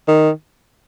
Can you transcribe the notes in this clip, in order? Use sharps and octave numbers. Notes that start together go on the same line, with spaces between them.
D#3